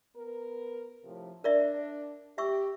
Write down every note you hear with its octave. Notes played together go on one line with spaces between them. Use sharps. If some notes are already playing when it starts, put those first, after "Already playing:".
B3 A#4
A2 C3 F3
D4 A#4 D5 E5
G4 E5 C#6 E6